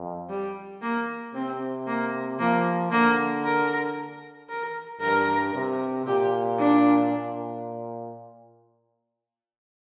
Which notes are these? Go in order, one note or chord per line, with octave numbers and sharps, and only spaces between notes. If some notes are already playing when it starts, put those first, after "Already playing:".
Already playing: F2
G3
A#3
C3 C4
A#3
F3 A#3
D3 A#3
A#4
A#4
G2 A#4
C3
A#2 G4
D4
A#2